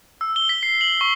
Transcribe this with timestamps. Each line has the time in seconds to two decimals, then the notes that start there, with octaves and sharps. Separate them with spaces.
0.21 E6
0.36 G7
0.49 B6
0.63 C7
0.81 F#7
1.01 C#6